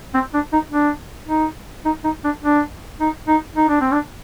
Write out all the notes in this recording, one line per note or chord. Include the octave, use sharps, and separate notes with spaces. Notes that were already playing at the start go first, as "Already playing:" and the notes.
C4
D4
D#4
D4
D#4
D#4
D#4
D4
D4
D#4
D#4
D#4
D4
C4
D4